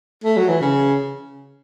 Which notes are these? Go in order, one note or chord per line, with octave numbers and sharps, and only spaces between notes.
A3
F#3
E3
C#3